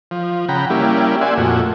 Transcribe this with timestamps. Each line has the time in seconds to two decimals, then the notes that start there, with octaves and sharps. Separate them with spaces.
0.11 F3
0.49 C#3 F#5 G5 A#5 B5
0.70 G3 A#3 C#4 E4 G4
1.21 D5 E5 F#5 G#5 C6
1.37 F2 A#2 A3 F#4